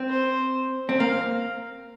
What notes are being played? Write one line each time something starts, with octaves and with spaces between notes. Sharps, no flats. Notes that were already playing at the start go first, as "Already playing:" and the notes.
Already playing: C4
C5
C4
A#3 F5